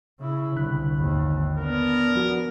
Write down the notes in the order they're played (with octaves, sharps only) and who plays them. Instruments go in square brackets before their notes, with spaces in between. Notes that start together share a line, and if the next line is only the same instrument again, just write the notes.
[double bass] C#3 E4
[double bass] C2 [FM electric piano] D3 B5 F#6
[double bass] G#1 D#2
[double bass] B3 D4 [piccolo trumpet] A#4
[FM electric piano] F3 F#4